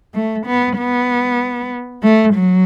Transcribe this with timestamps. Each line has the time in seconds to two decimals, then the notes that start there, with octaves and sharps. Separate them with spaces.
0.14 A3
0.46 B3
0.78 B3
2.03 A3
2.34 F#3